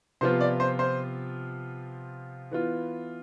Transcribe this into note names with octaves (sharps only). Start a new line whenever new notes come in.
C3 F3 B3 F4 C5
D5
C5
C5
E3 B3 F4